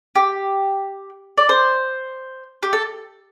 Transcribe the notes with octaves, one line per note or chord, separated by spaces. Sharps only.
G4
D5
C5
G4
A4